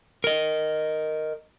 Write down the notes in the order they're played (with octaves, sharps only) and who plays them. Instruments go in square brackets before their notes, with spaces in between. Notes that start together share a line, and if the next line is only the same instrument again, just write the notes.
[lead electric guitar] A#4 D#5